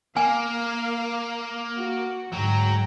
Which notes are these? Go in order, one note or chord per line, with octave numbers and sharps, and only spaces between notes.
A#3 A#4 F5 G#5
F#4
D2 G#2 F#3 G5 A#5